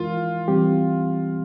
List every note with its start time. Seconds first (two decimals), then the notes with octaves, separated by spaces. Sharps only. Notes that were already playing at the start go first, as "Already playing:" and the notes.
Already playing: F2 E3 G#3 E4 F4 A#4
0.48 E3 G3 C4 G4